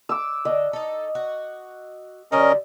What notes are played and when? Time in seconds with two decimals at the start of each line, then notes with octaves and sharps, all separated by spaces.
0.09 D6 E6
0.45 D3 D#5
0.73 D#4 A4
1.15 F#4
2.32 D3 F#3 G3 C#4 A#4 D#5